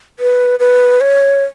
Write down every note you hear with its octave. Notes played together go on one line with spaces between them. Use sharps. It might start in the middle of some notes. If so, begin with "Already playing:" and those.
B4
B4
C#5